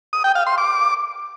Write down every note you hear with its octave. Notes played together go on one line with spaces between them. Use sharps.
D#6
G5
F5
C6
D6